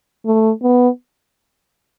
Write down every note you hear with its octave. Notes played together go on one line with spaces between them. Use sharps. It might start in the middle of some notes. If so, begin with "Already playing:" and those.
A3
B3